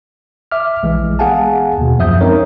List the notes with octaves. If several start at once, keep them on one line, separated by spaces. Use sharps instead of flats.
E5 D6 F6
A#1 E3 G#3
B3 G#4 F5 F#5 G#5 A5
D#2 B2
F#2 F3 E5 D#6 G6
G#3 C4 C#4 D#4 A#4 C#5